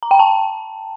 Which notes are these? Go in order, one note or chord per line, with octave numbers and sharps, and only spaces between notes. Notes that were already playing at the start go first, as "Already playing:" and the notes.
A#5
G5
A5